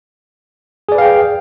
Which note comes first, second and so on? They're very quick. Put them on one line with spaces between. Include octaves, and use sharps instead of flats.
G#4 D5 B4 F5 G5